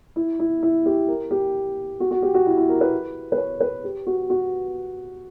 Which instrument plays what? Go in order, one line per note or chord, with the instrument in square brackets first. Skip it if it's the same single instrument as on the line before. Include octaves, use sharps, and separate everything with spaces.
[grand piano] E4
E4
E4
G4
A#4
G4
F#4
F#4
G4
F#4
E4
E4
A#4
B4
B4
C#5
B4
G4
F#4
F#4